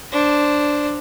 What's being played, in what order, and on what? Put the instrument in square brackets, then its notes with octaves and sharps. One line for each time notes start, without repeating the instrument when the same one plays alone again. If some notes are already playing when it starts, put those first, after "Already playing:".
[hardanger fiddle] D4 C5